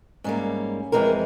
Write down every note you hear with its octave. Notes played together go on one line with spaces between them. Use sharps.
G#2 G3 A#3 C#4
F2 C#3 E3 G#3 C4 A#4